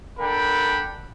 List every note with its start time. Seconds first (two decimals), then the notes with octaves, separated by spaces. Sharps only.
0.19 D4 A4 A#4 F#5 G5 B5